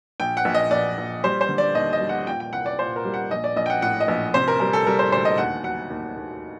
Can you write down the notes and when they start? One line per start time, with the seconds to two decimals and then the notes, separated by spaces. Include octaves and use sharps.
0.20 A#1 G5
0.37 F#5
0.45 A#1
0.55 D#5
0.71 A#1 D5
0.98 A#1
1.24 G3 C5
1.41 C5
1.49 D3
1.58 D5
1.75 D#2 D#5
1.93 D#5
2.01 G3
2.09 F#5
2.27 A#2 G5
2.40 G5
2.52 C2 F#5
2.66 D5
2.79 A#2 C5
2.96 A#4
3.05 G3
3.14 F#5
3.31 A#1 D#5
3.44 D5
3.56 A#1 D#5
3.66 G5
3.70 F#5
3.82 A2 F#5
4.00 D#5
4.08 A#1
4.34 C3 C5
4.48 A#4
4.60 G3 A#4
4.73 A4
4.86 G3 A#4
4.99 C5
5.12 D2 C5
5.25 D#5
5.38 D#2 F#5
5.63 F#3 F#5
5.90 D#2
6.16 D#2